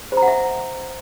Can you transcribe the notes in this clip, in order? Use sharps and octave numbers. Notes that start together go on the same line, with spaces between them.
C5
A#5
F#5
E5